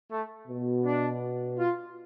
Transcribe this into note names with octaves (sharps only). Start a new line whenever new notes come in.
A3
B2
D4
F4